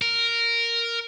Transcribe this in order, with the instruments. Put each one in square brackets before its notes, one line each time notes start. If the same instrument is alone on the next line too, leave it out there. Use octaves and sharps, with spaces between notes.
[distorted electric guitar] A#4